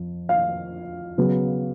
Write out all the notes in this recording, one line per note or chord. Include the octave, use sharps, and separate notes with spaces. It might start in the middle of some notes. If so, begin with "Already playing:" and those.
Already playing: F2 F3
F5
C#3 F#3 B3